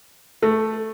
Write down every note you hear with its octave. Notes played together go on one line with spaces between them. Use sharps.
A3